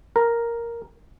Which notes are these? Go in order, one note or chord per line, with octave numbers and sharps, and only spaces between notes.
A#4